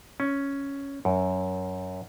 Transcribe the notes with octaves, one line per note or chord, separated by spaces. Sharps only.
C#4
F#2